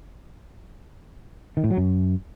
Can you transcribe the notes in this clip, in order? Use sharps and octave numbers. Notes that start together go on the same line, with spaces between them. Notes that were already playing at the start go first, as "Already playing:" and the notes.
D#3
A2
F#3
F#2